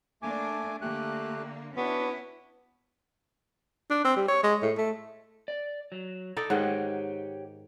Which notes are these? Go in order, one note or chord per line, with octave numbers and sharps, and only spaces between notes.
A3 A#3 D4 G#5 D6
D3 A3 A#3 G4 F#6
B3 C#4 D4 E4 F#4
D4
C4
G3
C#5
G#3
A2
A3
D5
F#3
D#4 A4 D5
G#2 D#3 G4 C#5 F#5